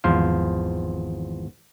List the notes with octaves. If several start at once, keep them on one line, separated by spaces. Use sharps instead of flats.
G#1 E2 F3 C5 F5